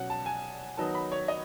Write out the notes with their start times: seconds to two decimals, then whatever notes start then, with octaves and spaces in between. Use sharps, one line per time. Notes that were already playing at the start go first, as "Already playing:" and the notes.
Already playing: B2 F#3 C#4 F#5
0.10 A5
0.26 G#5
0.78 D#3 F#3 B3 D#4 A5
0.95 B5
1.12 C#5
1.28 D#5